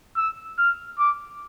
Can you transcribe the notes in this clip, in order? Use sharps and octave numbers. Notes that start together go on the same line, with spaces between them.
E6
F6
D6